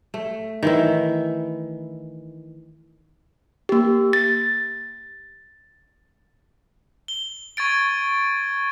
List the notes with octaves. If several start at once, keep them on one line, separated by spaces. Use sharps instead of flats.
A3
D#3 E3 E4
A#3 G4
A6
G7
C#6 G#6 A6 D7